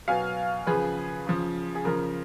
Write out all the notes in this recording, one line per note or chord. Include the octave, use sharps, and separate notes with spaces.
B2 F#3 F5 G#5
C#3 F3 G#4 B4
C#3 F3
G#4
C#3 F3 A#4